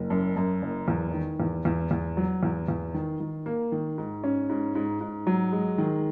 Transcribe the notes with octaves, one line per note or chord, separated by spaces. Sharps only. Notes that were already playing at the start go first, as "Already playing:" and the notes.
Already playing: F#1
F#2
F#2
F#1
E2
D#3
E2
E2
E2
F#3
E2
E2
D#3
D#3
A#3
D#3
G#2
C#4
G#2
G#2
G#2
F#3
G#3
D#3